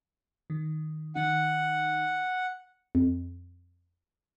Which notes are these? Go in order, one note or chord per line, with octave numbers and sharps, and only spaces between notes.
D#3
D#3 D#4 F#5
F2